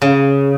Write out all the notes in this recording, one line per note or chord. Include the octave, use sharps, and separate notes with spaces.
C#3